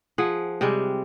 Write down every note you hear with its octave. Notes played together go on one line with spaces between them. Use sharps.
F3 G#4 F#5
C3 G3 G#3